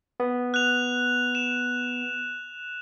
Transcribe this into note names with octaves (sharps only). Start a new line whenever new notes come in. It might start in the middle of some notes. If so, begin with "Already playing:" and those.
B3
F#6 F7
E7